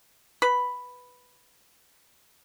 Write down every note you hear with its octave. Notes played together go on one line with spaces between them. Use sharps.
B4 B5